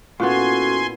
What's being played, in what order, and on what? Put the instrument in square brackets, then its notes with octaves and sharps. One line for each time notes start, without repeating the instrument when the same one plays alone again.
[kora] A#2 B3 [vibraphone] C#4 F#4 A4 [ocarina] E4 [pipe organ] G#5 C6